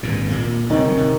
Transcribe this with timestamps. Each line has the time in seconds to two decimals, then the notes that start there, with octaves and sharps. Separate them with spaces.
0.03 G#1 G2 A#2
0.29 A#2 A#3
0.70 C3 D#3 C4 C#6
0.84 E3 F#3
0.97 C3